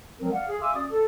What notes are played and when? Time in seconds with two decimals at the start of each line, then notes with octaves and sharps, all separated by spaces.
0.20 F3 F#3 G#3 C4 A#4
0.33 D5 F5 F#5
0.48 G#4
0.61 E5 F5 G#5 C6 D6 E6
0.75 C#4 F#4 D5 D#6
0.91 A4